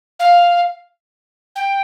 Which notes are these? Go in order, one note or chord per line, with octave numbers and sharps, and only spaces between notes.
F5
G5